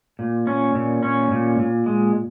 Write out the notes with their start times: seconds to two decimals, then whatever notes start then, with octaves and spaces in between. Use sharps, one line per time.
0.19 A#2
0.47 C#4
0.75 A#2
1.03 C#4
1.31 A#2
1.59 A#2
1.86 G#3